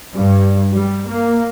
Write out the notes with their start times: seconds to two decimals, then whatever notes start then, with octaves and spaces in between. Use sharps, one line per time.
0.14 G2
0.71 G3
1.09 A#3